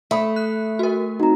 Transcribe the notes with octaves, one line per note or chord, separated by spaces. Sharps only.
A3 E5 B5 D#6
F#6
F#4 A#4
C4 D#4 F#4 A#5